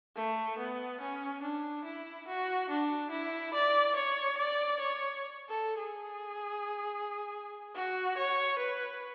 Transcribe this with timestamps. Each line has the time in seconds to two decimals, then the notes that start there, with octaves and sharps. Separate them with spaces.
0.16 A3
0.58 B3
1.00 C#4
1.42 D4
1.85 E4
2.27 F#4
2.69 D4
3.11 E4
3.54 D5
3.95 C#5
4.37 D5
4.80 C#5
5.49 A4
5.78 G#4
7.75 F#4
8.17 C#5
8.59 B4